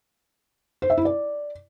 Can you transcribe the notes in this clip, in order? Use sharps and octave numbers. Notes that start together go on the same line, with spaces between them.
C5
E5
E4
D5